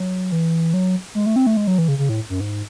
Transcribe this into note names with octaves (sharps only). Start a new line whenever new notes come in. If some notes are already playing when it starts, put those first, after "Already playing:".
Already playing: F#3
E3
F#3
G#3
A3
C4
A3
G#3
F#3
E3
C#3
C#3
A2
F#2
G#2